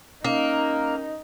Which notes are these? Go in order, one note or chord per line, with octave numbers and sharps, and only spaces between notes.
A#3 C#4 D#4 A#4